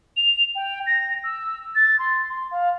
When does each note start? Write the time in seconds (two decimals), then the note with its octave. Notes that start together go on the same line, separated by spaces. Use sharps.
0.17 F7
0.55 G5
0.86 A#6
1.24 E6
1.75 A6
1.99 C6
2.30 C6
2.51 F5